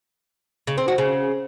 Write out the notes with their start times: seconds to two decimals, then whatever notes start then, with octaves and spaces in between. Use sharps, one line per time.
0.67 C#3
0.78 C4
0.88 F#4
0.98 C#3